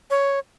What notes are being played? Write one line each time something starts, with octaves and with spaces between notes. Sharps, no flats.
C#5